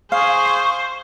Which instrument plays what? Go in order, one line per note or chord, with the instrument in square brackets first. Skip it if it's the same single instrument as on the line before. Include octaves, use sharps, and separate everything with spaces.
[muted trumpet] G#4 [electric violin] C5 [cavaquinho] F5 [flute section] C#6